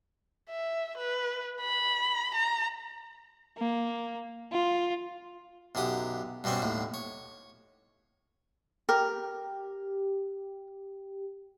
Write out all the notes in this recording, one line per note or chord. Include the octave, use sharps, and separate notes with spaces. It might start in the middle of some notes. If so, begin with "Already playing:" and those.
E5
B4
B5
A#5
A#3
F4
B1 F#2 D3 G4 D#6
G2 B2 G3 C4 C#4
D#2 A2 D3
C#5
G4 A#4